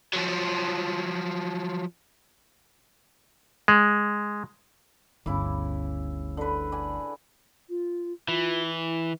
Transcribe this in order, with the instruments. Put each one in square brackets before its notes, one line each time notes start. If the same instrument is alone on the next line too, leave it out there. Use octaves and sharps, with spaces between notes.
[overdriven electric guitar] F3 F#3
[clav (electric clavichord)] G#3
[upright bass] G1 D2 [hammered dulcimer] C#3 E4 D6
[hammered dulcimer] D3 B4
D5 F#5 G#5
[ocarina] F4
[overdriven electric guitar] E3 [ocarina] F4
[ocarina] E4